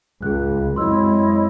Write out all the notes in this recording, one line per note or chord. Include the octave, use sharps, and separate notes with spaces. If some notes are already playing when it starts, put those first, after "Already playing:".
C#2 G#4 F#6
F#2 G#3 C4 E4 C#5 D#5 C6 E6